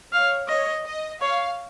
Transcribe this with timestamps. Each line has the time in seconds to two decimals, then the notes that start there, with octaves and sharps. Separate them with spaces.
0.12 C#5 F5
0.48 C#5 D#5
0.86 D#5
1.21 C#5 F5